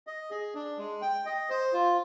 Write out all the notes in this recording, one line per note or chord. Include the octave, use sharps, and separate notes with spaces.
D#5
G#4
D4
G#3
G5
D#5
C5
F4